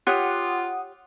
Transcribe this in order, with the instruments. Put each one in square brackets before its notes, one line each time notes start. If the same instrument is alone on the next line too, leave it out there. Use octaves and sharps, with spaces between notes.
[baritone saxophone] F4 [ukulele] G4 C#5 [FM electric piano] F#5 D#6